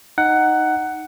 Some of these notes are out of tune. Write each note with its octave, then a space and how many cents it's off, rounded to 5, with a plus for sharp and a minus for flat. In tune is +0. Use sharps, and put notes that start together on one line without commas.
D#4 -5 F#5 +10